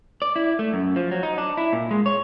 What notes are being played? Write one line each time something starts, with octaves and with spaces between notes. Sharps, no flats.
D5
E4
A3
F#2
F3
F#3
D#4
D4
E4
A#2
G#3
C#5